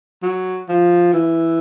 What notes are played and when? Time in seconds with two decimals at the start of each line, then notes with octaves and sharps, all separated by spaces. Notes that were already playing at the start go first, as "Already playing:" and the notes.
0.22 F#3
0.69 F3
1.14 E3